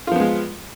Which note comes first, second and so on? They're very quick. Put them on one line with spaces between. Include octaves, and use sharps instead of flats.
F4 F3 B3 G#3